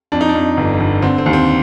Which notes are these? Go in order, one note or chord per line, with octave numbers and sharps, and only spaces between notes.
F2 D4
D#4
D4
F2
G1
G1
D3 C4
C4
D#2
C4